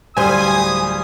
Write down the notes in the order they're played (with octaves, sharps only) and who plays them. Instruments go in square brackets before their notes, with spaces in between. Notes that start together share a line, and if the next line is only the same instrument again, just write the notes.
[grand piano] D1 G3 C5 [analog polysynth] G#5 [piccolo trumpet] D#6